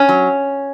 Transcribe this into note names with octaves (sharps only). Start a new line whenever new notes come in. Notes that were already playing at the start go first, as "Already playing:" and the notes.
Already playing: C#4
F#3